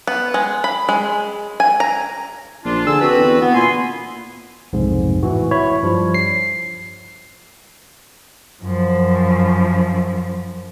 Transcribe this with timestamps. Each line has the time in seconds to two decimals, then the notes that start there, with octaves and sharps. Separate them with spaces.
0.07 B3
0.34 G#3
0.64 B5
0.89 G#3
1.60 G#5
1.80 A#5
2.65 A#1 D4 F4
2.86 D3 G#4 A5 E6
3.01 C4 F#4 B4
3.19 E2
3.40 B3
3.54 A#2 E4 G#5 C6
4.73 B1 F2 G#2 C3
5.23 A2 E3 F#4
5.51 E4 C#5 B5
5.83 G2 F3 G3
6.15 C7
8.62 F#2 F3